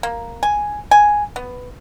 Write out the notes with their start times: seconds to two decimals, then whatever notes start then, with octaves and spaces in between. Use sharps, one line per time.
0.03 A#3
0.43 G#5
0.91 G#5
1.36 B3